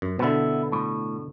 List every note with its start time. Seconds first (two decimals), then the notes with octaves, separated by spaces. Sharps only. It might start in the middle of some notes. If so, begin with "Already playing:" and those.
0.02 F#2
0.19 B2 D3 B3 E4
0.72 A2